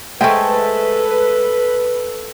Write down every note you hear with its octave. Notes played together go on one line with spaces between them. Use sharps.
G#3 A3 A4 B4 C5 E5 G5